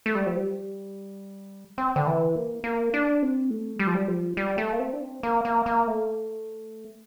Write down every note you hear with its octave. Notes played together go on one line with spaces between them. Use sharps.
A3
G3
F3
G3
C4
D3
E3
A#3
A#3
D4
C4
A3
G3
F3
G3
F3
G3
A3
A#3
C4
D4
C4
A#3
A#3
A#3
A3